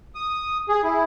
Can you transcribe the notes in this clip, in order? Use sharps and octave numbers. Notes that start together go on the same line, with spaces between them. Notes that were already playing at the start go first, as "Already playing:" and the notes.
D#6
G#4
E4